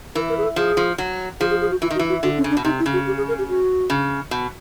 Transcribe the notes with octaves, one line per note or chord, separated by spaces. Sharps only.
E3 A#4
A#4
G#4
A4
F3 G#4
F3
F#3
F3 G#4
G#4
G#4
F#4
E3 F4
D#3
F#4
E3
F#4
D3 F#4
C#4
C#3
D4
B2
C3 D#4
E4
C#3
F#4
G4
G#4
A#4
G4
F#4
C#3
B2